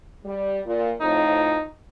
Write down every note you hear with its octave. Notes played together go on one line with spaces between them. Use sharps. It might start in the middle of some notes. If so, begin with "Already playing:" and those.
G3
A#2
F2 A2 D#4